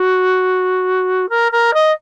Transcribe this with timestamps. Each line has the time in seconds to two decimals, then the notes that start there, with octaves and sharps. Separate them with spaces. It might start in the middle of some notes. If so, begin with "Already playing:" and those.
Already playing: F#4
1.29 A#4
1.52 A#4
1.73 D#5